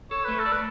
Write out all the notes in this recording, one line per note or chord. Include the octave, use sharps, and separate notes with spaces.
A4 C#5
A3 B4
A4
D5
B4